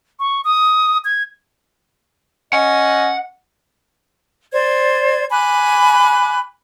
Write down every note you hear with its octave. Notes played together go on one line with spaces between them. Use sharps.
C#6
D#6
G#6
C#4 D#5 F#5
C5 D5 G#6
G#5 B5 D6 F#6